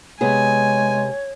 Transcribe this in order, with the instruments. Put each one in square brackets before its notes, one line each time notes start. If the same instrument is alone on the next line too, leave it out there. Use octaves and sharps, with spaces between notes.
[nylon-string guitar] C3 B3 G#4 [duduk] G#3 [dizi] C#5 [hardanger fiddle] G#5